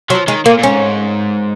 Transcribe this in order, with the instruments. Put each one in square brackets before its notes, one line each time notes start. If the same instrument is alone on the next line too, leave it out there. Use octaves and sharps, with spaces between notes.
[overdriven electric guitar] F3 [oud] F#3
[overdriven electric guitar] D#3 [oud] G#3
[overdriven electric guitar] A#2 [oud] A#3
[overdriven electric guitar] A#2
[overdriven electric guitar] G#2 [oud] C#4